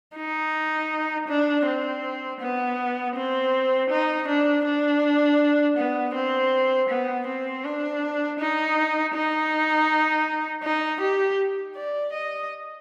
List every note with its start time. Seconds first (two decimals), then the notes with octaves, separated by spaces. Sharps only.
0.16 D#4
1.28 D4
1.66 C4
2.41 B3
3.16 C4
3.90 D#4
4.28 D4
4.65 D4
5.77 B3
6.15 C4
6.89 B3
7.27 C4
7.64 D4
8.39 D#4
9.14 D#4
10.63 D#4
11.01 G4
11.76 D5
12.13 D#5